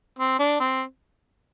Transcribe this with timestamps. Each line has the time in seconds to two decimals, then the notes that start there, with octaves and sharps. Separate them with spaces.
0.19 C4
0.40 D4
0.60 C4